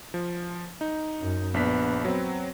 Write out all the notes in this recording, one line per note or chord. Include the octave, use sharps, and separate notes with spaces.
F3
D#4
F#2
A#1 B3 D4 B6
F#3 C4